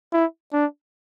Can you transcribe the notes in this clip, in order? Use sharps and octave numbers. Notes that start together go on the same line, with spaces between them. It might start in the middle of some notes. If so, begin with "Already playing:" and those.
E4
D4